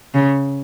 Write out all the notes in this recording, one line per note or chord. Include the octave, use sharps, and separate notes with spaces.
C#3